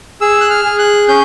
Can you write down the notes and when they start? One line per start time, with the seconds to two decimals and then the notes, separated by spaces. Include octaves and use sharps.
0.21 G#4 E6
0.41 F#6
0.50 F6
0.65 G#4
0.79 F#6
1.08 C#4 G6